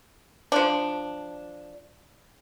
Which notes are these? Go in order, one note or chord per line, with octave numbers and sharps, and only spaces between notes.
F3 D4